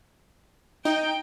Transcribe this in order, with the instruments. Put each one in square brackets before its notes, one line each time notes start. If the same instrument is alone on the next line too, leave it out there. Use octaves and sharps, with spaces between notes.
[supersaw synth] D#4 [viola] G5